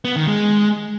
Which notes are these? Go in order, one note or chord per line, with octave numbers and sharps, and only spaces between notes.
B3
D#3
G#3